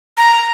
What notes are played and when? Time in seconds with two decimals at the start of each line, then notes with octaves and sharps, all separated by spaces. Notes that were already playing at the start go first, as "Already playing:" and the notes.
0.17 A#5